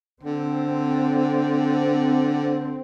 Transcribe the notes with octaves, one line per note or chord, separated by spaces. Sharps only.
D3 C4